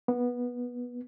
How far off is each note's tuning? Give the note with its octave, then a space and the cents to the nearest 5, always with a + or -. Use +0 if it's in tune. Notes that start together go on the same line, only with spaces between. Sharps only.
B3 -15